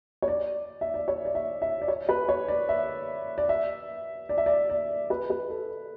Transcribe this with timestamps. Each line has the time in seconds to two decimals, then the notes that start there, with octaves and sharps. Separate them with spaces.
0.22 C#5
0.28 D5
0.81 E5
0.94 D5
1.08 C#5
1.25 D5
1.35 E5
1.62 E5
1.82 D5
1.88 C#5
2.09 B4
2.29 C#5
2.48 D5
2.69 E5
3.38 D5
3.49 E5
4.29 D5
4.38 E5
4.46 D5
4.70 D5
5.10 B4
5.30 B4
5.50 A4